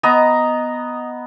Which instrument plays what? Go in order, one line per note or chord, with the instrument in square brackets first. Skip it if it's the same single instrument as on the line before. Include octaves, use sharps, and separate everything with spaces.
[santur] B3 D#5 A#5